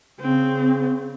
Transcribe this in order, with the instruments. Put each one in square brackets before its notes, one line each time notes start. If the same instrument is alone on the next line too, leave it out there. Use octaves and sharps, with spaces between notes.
[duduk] C#3 [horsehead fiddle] C4